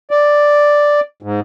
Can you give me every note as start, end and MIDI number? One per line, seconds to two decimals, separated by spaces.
0.11 1.00 74
1.22 1.40 44